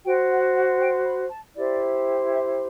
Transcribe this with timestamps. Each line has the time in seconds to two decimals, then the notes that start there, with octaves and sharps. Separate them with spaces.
0.04 F#4 C5 G5
0.30 F#5
0.55 F#5
0.80 G5
1.05 B5
1.30 A5
1.55 E4 G4 C5 D5
2.31 E5